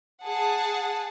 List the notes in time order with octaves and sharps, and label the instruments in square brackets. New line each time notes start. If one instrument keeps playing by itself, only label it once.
[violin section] G#4 F#5 A5